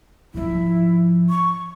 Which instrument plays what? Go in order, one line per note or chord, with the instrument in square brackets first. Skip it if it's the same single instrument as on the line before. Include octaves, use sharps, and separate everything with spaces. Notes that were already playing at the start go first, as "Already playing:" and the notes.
[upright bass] G#2 F3 [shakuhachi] E4
[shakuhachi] C#6